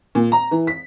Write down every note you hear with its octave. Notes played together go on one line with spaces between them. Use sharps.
A#2
A#5
E3
B6